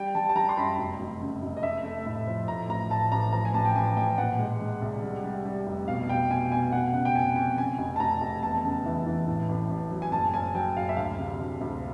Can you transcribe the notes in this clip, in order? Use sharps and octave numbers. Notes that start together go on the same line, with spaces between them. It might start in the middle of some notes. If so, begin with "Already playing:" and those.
Already playing: G3 G5
G3 A5
A5
G3 A#5
C6
F#2 B5
F1
F1
C#3
F1
D#5
A3 E5
A3
A2
F3
A2 A#5
A1 A#5
A2 A5
A1 A#5
F3 A#5
G#5
A1 A5
G5
A1 G#5
A1 G5
A#2 F#5
G#3
G#3
C2
G3
G3
G3
F1
B2 F5
B2 G5
B2 G#5
B2 G#5
F1 F#5
C#3 F#5
G5
F2 G#5
F2 G5
C#3 G#5
F1
A5
F1 A#5
F1
E2 A5
C#3
E3
E3
A2
A1
A1
F#3
G#5
F#1 A5
F#1 G#5
F#3 G5
F#1 F5
E5
D2 F5
C3
D2
D2